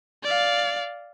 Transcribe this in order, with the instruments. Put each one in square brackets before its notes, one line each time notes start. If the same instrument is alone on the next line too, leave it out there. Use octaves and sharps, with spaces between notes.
[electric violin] D5 F5